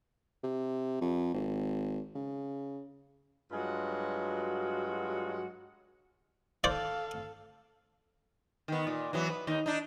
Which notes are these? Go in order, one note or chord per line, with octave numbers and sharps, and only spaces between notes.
C3
F2
G#1
C#3
G2 F#3 G#3 F4 F#4
A4 C5 D5 F5
D#3 B3
A#2
E3 F#3 B3
B4
D#2 D#4
D4 D#4